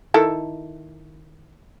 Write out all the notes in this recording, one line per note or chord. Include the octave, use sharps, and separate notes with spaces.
D#3 E4 A4